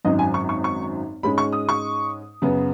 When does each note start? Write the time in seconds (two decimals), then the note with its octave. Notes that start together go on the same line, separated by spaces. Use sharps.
0.05 G#1 F#2 F#3 D#4 D#5
0.19 G#5
0.34 C#6
0.49 C#6
0.64 C#6
1.23 G#2 G#3 C#4 B5
1.38 C#6
1.53 D#6
1.69 C#6
2.42 F#2 C#3 B3